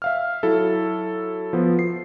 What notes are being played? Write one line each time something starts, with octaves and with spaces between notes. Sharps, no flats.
E5 F5 F6
F#3 E4 A4
F3 B3
C7